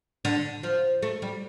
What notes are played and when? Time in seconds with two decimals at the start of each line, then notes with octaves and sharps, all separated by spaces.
0.25 D3
0.63 F3
1.02 A3
1.22 G3